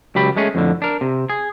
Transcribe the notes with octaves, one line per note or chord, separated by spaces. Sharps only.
C#2 F#3 G4 B5
G#3 A3 C#4 G#4
F2 A2 D3
D4 A#4
C3
G#4